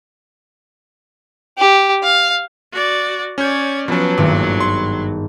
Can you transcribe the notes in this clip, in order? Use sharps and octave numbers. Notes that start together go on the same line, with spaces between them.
G4
F5
F#4 D5
C#4 C#5 D5 G6
F3 F#3 B3 C#4 A5
G#1 G2 A#2
C6